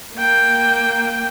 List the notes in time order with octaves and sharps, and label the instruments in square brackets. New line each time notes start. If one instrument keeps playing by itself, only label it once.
[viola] A#3 G5